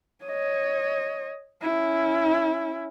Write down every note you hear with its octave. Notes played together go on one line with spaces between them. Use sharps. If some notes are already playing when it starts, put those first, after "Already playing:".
C#5 D#5
C#4 E4